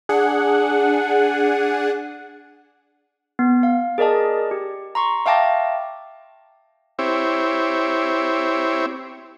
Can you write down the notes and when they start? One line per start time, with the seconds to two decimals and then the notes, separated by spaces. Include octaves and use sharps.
0.09 D4 G#4 F#5
3.39 B3
3.63 F5
3.98 G#4 A#4 D5 D#5 A5
4.51 G4
4.95 A#5 C6 C#6
5.26 E5 F5 G5 A5 D6 A#6
6.99 C4 E4 G4 C#5